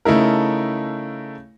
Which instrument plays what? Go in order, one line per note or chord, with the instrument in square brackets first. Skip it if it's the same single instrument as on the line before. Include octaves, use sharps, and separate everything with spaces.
[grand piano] C#3 A3 D#4 E4 A#4